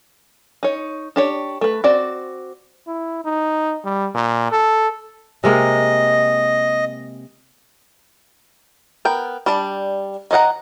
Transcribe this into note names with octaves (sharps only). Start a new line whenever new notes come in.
D#4 C#5
D4 G4 C#5
A3 B4
C4 F#4 D5
E4
D#4
G3
A#2
A4
C3 G#3 A#3 D#5
B3 A#4 G5
G3 D4 A5 B5
D#3 D#4 D#5 F#5 A#5